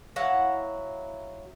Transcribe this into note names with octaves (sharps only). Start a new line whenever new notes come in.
F#3 E4 F5 F#5